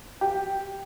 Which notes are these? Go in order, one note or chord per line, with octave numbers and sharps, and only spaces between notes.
G4